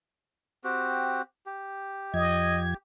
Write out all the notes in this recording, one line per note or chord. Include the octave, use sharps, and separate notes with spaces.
C4 F#4 G4
G4
F2 F3 D#5 G#6